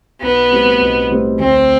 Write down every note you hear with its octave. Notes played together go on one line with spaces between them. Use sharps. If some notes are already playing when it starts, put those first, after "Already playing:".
B1 B3
A2 G3 C4 E4
B1
A2 G3 C4 E4
D2 C4